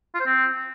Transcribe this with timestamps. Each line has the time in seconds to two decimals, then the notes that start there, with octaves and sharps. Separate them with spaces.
0.15 F4
0.20 C5
0.26 C4